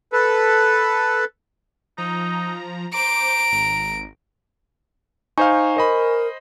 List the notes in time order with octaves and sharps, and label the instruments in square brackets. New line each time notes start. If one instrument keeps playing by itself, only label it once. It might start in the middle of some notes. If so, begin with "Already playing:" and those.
[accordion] A4 B4
[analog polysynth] F3 A#5 [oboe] D#4
[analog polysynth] C5 D6 [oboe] A#5 [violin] D7
[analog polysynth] G#1
[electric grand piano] D#4 C5 F5 [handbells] G#5 C#6
[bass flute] A#4 [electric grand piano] C5 D#5 B5